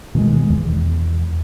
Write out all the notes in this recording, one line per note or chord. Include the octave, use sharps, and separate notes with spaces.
B2 D#3 F#3 G#3
E2